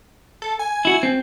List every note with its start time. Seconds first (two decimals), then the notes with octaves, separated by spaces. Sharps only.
0.42 A4
0.59 G#5
0.85 E4 F#4
1.03 C4